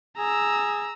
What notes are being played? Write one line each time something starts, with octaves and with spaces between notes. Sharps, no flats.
G#4 A#5 E6